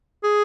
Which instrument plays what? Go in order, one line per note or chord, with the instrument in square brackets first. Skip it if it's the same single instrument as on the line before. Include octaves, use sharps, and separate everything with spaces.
[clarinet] G#4